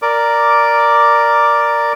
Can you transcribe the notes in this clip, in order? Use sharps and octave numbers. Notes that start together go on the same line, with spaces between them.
A#4 D5 D6